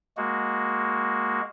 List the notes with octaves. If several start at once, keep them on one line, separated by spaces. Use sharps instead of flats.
G#3 A#3 F#4